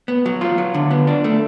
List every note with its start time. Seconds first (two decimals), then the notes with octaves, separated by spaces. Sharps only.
0.08 B3
0.26 F#3
0.41 F4
0.58 F#3
0.74 D3
0.91 B3
1.07 D4
1.24 A3